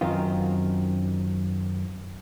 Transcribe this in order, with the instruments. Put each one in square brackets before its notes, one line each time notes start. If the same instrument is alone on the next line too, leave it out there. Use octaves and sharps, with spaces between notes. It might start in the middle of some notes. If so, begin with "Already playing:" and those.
[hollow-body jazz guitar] F#2 D#3 C4 F4